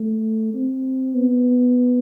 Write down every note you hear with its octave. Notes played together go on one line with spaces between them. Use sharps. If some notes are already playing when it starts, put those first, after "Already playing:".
Already playing: A3
C4
B3